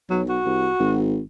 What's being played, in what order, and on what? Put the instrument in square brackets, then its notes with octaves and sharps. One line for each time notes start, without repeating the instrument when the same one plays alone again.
[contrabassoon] B1 [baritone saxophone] F#3
[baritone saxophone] F#4
[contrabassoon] C2
G#1